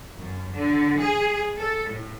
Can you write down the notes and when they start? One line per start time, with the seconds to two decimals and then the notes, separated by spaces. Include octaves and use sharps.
0.15 F#2
0.55 D3
1.00 G#4
1.56 A4
1.89 A2